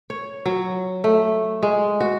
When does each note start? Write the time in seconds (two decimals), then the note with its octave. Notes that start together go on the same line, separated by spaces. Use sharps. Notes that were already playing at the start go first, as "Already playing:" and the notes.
0.10 C#5
0.46 F#3
1.04 A3
1.63 G#3
2.00 F#4